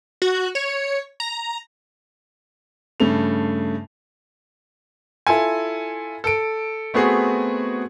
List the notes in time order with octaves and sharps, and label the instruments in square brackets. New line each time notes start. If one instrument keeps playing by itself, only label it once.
[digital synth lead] F#4
C#5
A#5
[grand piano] G2 C#3 A3 F7
[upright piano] E4 F4 A4 G#5
A4 D7
A3 B3 C4 F#4 G#4